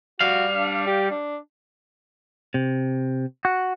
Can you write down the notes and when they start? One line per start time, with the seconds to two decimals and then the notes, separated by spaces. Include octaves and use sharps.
0.21 G3 F#4 F5
0.56 D4
0.87 G4
1.10 D4
2.54 C3
3.45 F#4